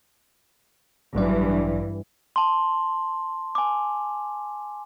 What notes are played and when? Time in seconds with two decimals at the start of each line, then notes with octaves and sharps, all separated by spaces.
1.15 A1 G2 E3 F#3 D5
2.36 A5 C6
3.55 G#5 D6